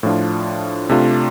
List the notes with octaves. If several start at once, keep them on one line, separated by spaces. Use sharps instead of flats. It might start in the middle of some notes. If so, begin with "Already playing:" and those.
A2 F3 D4 F4
C3 A3 D4 F4